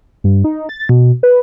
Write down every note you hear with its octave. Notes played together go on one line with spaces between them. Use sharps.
G2
D#4
A6
B2
B4